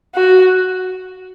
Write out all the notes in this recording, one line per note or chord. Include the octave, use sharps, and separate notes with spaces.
F#4